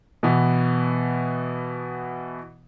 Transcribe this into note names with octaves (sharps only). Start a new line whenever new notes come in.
B2 E3 B3